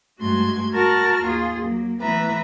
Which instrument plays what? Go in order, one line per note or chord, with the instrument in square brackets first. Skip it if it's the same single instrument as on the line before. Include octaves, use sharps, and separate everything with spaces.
[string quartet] G2 G#3 A3 F#4 C6 G#6
F#4 A#4 A5 A#5 C#6 F6
D#2 F4 G#4
F#3 A#3
E3 A3 B3 B4 E5 A#5